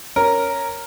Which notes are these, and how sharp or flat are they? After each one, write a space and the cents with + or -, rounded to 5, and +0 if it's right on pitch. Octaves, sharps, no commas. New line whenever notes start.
C#4 +0 A#4 +0